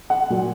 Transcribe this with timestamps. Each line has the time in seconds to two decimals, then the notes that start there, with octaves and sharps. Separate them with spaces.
0.10 F#5
0.30 A#2 F#3